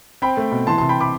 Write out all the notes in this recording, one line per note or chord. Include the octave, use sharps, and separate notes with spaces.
C4 G5 B5
A3
B2
E3 A5 C6
A5 C6
C3
G5 B5
B5 D6